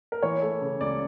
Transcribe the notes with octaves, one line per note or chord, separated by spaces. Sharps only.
A#4
E3 C#5
A3
C#3
C#2 D5